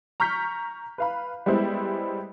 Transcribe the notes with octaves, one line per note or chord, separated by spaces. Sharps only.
A#5 C#6 F6 G6 B6
B4 F5 B5
G3 G#3 B3 E4 C5